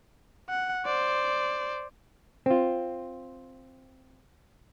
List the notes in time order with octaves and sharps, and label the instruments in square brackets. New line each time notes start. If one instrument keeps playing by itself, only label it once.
[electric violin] F#5
C5 D5
[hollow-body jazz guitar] C4 F4